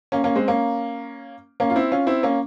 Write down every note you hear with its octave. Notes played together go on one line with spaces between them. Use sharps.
A#3 C#4
A#3 C#4
G#3 C4
A#3 C#4
A#3 C#4
F4
C4 E4
C#4 F4
C4 E4
A#3 C#4